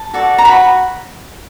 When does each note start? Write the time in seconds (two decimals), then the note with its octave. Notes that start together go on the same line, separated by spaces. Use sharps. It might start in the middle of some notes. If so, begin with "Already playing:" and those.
Already playing: A5
0.14 F#4 A4 D5
0.38 A#5
0.45 F#4 B5